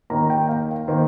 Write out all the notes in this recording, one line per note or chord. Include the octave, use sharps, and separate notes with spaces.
D#2 D#3 A#3 A#5
G5
F5
D#3 A#3 C5